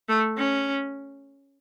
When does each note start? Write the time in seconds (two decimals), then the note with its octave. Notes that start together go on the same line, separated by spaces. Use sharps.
0.09 A3
0.37 C#4